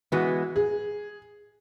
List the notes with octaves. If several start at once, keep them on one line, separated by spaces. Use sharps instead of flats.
E3 G#3 B3 F#4
G#4